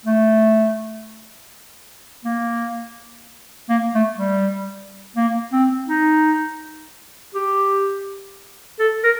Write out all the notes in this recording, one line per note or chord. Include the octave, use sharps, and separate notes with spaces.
A3
A#3
A#3
A3
G3
A#3
C4
D#4
G4
A4
A#4